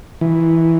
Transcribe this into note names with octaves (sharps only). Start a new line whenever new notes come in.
E3